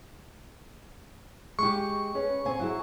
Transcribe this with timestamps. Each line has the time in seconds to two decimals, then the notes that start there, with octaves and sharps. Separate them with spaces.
1.59 G#3 G4 C#6
2.15 C#4 G#4 B4
2.45 C4 G#5
2.59 F#3 E4 G#4